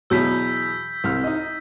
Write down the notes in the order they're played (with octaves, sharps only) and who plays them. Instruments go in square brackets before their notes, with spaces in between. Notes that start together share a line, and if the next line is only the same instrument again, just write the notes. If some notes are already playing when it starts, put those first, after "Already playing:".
[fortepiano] E2 B2 F#3 [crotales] E6 G6 B6
[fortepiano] C2 F6
D#4 D#5